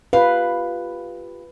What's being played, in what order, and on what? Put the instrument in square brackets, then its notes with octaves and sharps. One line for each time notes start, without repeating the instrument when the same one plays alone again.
[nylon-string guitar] F4 G4 F5 [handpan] B4